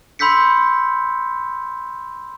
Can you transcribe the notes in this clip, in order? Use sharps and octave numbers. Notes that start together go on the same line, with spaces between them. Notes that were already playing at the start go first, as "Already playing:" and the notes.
B5 C6 E6 G6 B6 C#7